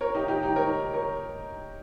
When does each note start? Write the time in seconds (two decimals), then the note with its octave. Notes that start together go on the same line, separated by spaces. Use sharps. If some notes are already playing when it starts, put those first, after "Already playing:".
0.01 A#4 C#5
0.15 D#4 G4
0.28 D#4 G4
0.43 D#4 G4
0.56 A#4 C#5
0.93 A#4 C#5